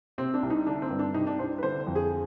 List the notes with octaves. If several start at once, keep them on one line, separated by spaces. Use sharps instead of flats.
C3 C4
D4
C2
D#4
D3 D4
C4
G2
D4
C3 D#4
D4
C2 C5
B4
D3 C5
F2
G#4